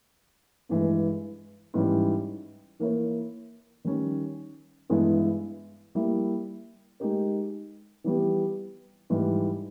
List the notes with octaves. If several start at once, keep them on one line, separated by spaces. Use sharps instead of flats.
G2 E3 G#3
G#2 E3 G3 C#4 E4
E3 A#3 E4 A#4 C#5
D#3 G3 C#4
G2 E3 G#3 B3 E4
G3 A#3 E4
G#3 D#4 G4 A#4
E3 G3 B3 G4
G#2 E3 G3